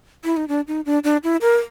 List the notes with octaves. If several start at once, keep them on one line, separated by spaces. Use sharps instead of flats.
E4
D#4
D4
D#4
D4
D4
E4
A#4